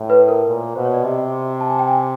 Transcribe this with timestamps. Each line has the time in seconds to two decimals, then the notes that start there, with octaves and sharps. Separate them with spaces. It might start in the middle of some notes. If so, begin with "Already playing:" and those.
Already playing: A2
0.10 B4
0.28 A#4
0.47 A#2
0.76 B2 C5
0.85 C#5
0.94 D5
1.04 C3 D#5
1.61 A5
1.70 G#5
1.79 G5
1.88 G#5